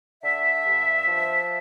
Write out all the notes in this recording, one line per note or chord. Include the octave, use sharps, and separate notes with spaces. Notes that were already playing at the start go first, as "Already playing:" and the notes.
D3 E5
G2
F3